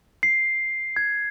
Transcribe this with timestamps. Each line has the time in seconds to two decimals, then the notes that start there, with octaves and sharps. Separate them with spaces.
0.23 C7
0.96 G#6